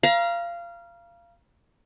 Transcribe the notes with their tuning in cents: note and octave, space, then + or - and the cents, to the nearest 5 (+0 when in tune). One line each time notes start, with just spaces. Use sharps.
F5 -20 A#5 +30